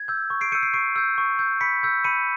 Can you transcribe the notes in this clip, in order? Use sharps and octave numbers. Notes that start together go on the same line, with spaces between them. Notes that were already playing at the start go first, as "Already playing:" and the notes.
Already playing: G#6
E6 G6
C#6
C7 D7
E6 G6 C#7 D#7
C7 D7
C#6 C7 D7
E6 G6
C#6
E6 G6
B5 B6 C#7
E6 G6
B5 C#7 D#7